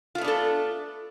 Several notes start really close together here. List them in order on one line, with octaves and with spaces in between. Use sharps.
F4 A3 B3 D4 A4